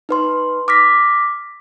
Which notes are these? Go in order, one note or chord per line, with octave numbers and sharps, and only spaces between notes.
D#4 B4 C6
D6 F6 A#6 B6